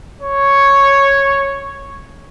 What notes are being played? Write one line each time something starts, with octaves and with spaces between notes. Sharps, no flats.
C#5